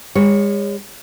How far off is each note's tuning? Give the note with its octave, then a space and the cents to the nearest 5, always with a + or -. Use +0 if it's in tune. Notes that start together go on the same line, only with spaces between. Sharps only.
G#3 -45 C#5 +0